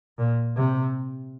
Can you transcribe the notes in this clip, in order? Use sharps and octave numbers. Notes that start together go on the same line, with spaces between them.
A#2
C3